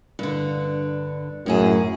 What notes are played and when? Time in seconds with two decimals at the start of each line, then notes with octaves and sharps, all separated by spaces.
0.19 G2 D3
1.46 F#2 A2 E4 G#4